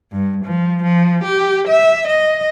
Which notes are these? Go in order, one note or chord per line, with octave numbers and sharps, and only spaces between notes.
G2
F3
F3
G4
E5
D#5